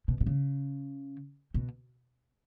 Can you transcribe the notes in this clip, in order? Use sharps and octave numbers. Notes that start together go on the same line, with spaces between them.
B2
B2
C#3
B2